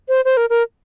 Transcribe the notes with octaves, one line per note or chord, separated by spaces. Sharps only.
C5
C5
A#4
A#4